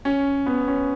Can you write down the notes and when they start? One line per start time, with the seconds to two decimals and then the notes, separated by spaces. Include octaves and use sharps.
0.05 C#4
0.46 B3
0.68 C#4